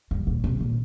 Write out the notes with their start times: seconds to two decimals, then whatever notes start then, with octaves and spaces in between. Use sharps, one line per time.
0.11 G2
0.27 A#2
0.44 C3
0.60 A#2